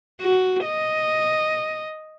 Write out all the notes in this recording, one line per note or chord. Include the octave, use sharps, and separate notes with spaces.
F#4
D#5